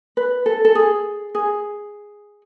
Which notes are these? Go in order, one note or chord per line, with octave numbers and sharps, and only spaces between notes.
B4
A4
A4
G#4
G#4